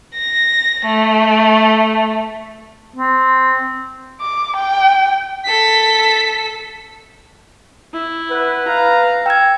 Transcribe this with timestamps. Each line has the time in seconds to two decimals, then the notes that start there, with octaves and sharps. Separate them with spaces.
0.15 A#6
0.86 A3
2.96 C4
4.21 D6
4.57 G5
5.45 A4 B6
7.93 E4
8.31 B4 F#5
8.68 F5 A#5
9.26 G5 E6 G#6